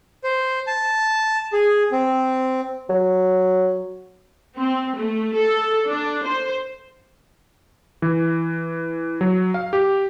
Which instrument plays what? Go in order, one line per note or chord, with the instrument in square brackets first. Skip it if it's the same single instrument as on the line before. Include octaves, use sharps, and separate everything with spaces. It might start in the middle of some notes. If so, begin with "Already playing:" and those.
[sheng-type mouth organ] C5
A5
G#4
C4
[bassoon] F#3
[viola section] C4
A3
A4
D4
C5
[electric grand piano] E3
F#3
F5
G4